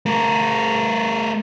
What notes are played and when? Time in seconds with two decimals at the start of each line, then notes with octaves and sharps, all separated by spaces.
0.06 A3 A#4